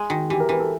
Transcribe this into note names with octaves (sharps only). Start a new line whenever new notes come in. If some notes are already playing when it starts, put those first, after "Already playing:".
Already playing: G#3
D#3 F#4
E3 G4
A#4
E3 B4
A4